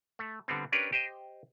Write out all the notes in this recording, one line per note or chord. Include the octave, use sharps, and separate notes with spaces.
A3
D3 G3 B3 C4
C#4 D4 G4 A#4 B4
G4 C5 D#5